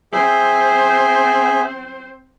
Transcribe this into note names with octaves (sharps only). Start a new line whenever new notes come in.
C4 G#4 C5 E5